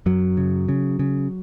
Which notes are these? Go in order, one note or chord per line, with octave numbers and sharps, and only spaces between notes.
F#2 F#3
C#3
C#3
C#3